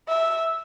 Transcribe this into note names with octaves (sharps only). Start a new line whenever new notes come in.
E5